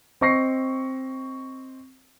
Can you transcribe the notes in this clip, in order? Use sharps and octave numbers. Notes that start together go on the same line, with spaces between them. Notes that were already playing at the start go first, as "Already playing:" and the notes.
C4 D#5 C#6 A#6 C7